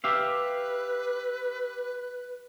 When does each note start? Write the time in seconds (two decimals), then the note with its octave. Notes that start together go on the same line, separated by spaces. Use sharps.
0.04 G4 B4 E5 F5